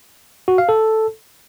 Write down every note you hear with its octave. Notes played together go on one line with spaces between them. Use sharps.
F#4
F5
A4